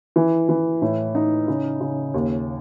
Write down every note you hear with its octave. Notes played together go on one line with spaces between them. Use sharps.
E3
E3
A2
D#4
C#3
C#3
D#2